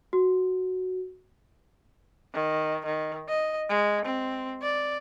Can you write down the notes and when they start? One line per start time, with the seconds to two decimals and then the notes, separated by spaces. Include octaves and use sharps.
0.13 F#4
2.34 D#3
2.85 D#3
3.28 D#5
3.69 G#3
4.05 C4
4.62 D5